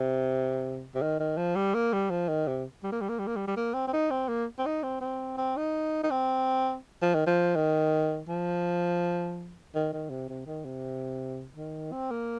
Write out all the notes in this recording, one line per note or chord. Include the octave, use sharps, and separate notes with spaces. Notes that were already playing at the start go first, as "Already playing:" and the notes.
Already playing: C3
C3
D#3
D#3
F3
G3
A#3
G3
F3
D#3
C3
G3
A#3
G3
A#3
G3
A#3
G3
G3
A#3
C4
C4
D#4
C4
A#3
C4
D#4
C4
C4
C4
D#4
D#4
C4
F3
D#3
F3
D#3
F3
D#3
D#3
C3
C3
D#3
C3
D#3
C4
A#3